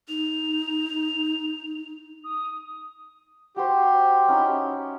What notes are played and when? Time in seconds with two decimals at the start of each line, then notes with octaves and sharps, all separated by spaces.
0.09 D#4 F7
2.24 D#6
3.56 F#4 G4 C5
4.28 C#4 D#4 E4